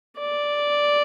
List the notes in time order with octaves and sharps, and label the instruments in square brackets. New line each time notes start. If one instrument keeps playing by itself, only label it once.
[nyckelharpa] D5